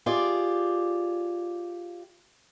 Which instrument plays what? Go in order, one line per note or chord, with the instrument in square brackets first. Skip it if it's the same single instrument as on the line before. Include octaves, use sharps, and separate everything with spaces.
[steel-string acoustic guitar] F4 G4 G#4 D5